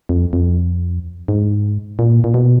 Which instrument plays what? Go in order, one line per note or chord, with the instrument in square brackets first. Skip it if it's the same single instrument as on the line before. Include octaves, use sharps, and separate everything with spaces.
[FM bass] F2
F2
G#2
A#2
A#2
B2